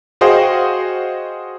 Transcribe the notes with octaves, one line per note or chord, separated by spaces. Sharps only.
F#4 G#4 C5 D#5 F5 G5